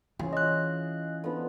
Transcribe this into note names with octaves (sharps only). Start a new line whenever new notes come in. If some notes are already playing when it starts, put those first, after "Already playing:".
E3 C#4 F4 G#4
D#5 F#6
D3 F3 B3